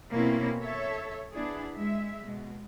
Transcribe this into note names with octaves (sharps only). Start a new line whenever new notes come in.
B2 A#3 C4 C#4 E4
A4 C#5 E5
B3 D4 E4 G#4
G#3 E5
B2 G#3